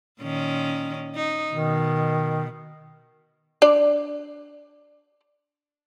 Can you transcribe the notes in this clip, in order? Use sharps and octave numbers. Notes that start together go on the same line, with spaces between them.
A#2 D#3 C#4
D#4
B2 D#3
D4 D5